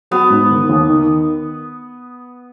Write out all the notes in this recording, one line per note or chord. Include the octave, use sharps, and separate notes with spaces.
F#3 B3
G#2
D#3
D#2
D#3